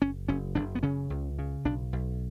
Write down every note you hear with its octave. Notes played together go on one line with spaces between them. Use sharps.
F#1 C#4
F#1 C#4
F#1 D4
B3
C#3 C#4
C#2
C#3
B1 D4
B1